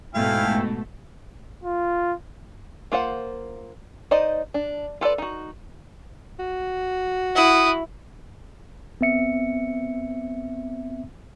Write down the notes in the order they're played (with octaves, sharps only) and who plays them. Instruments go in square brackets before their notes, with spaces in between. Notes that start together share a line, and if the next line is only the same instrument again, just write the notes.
[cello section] G#2 B2 [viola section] A3 [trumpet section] E4 G5 [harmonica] F5 G#5 F6
[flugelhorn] F4
[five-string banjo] A#3 F4 C5 F#5
D#4 C5 D5 D#5
D4
F4 A4 B4 D5
D#4 F#4
[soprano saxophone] F#4
[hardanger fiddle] E4 [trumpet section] F#5 D#6
[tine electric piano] B3 C4 E5 C#7